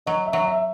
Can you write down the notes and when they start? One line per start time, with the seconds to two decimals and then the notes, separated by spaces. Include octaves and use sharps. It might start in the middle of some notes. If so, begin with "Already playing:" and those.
0.06 F#3 D#5
0.26 E5
0.33 F#3
0.46 E5